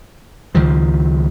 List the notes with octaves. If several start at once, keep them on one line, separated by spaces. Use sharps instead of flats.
C#2 D#3 F3